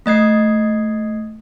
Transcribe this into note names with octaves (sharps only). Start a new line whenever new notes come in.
A3 D#5 G#6 C7